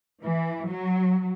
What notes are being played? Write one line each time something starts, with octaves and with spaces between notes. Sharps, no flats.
E3
F#3